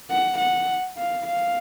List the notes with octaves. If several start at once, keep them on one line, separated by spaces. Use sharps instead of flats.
F#5
F#5
F5
F5